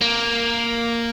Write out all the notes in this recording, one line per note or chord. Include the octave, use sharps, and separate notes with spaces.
A#3